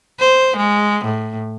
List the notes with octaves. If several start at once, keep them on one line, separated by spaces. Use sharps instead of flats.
C5
G#3
A2